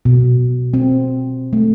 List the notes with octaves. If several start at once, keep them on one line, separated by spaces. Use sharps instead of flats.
B2
C4
A3